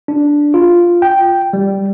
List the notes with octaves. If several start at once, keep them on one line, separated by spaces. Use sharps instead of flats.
D4
F4
G5
G3